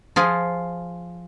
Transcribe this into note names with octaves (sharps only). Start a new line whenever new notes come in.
F3 F4 G#4